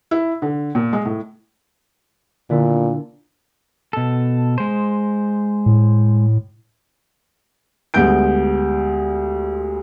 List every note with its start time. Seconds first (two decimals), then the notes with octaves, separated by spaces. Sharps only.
0.11 E4
0.42 D3
0.75 A#2
0.93 G#3
1.05 A2
2.50 A#2 D3 B3 E4
3.93 B2 A4
4.58 G#3 C5
5.66 A2
7.94 D2 G3 G#3 B3 G6 D7